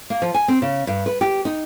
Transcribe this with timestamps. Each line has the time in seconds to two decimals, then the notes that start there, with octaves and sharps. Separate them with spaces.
0.10 A#3
0.22 F3
0.34 G#5
0.48 C4
0.62 C#3
0.87 G2
1.06 B4
1.21 G4
1.45 D#4